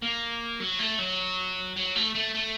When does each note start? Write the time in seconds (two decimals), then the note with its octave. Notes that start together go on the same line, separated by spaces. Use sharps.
0.02 A#3
0.60 F#3
0.79 A3
0.99 F#3
1.76 F#3
1.96 A3
2.15 A3
2.34 A3